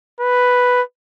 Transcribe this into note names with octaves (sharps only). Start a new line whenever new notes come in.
B4